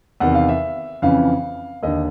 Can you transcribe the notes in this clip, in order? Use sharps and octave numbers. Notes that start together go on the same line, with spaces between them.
E2 C3 D#3 F#5
F5
E5
F2 C#3 E3 F5
D#2 D3 D#5